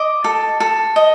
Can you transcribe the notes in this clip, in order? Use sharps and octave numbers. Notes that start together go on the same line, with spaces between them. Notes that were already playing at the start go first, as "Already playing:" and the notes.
Already playing: D#5 D6
A4
A4
D#5